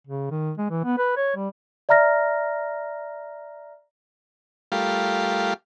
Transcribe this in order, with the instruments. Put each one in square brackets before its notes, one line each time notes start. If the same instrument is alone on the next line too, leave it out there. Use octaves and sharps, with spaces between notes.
[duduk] C#3
D#3
G#3
E3
B3
B4
C#5
G3
[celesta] D5 E5 A#5 F6 A#6
[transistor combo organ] G3 A3 F4 G4 A#4 F5